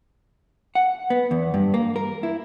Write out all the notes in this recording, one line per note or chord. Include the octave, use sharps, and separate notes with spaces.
F#5
B3
E2
G2
A#3
A#4
E4